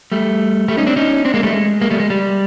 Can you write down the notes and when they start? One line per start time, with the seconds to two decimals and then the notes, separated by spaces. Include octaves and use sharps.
0.12 G3 A3
0.68 G3 A3
0.77 C#4 D#4
0.87 C4 D4
0.96 C#4 D#4
1.25 C4 D4
1.34 G#3 A#3
1.43 G3 A3
1.53 G#3
1.81 G#3 A#3
1.90 G3 A3
2.00 G#3
2.10 G3